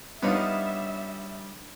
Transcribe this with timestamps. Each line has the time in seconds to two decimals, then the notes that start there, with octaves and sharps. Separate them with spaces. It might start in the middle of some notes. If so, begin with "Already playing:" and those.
0.23 G3 B3 D4 D#4 F4 C#5 E5